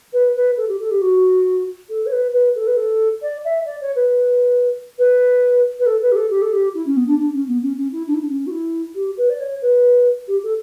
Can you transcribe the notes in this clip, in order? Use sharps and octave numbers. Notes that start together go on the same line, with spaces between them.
B4
B4
A4
G4
A4
G4
F#4
A4
C#5
B4
B4
A4
B4
A4
D5
E5
D5
C#5
B4
B4
B4
A4
B4
G4
A4
G4
A4
G4
E4
C#4
B3
D4
D4
C#4
B3
C#4
C#4
E4
D4
E4
D4
C#4
F#4
E4
G4
B4
D5
C#5
B4
G4
A4